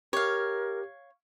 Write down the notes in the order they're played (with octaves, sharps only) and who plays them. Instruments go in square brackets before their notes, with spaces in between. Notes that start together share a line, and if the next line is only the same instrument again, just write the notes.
[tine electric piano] G4 [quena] A#4 [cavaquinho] C#5 F5